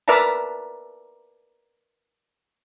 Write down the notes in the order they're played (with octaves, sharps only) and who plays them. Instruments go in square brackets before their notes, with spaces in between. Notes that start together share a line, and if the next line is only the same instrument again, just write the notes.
[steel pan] A#4 B4 D5 E5 A5 A#5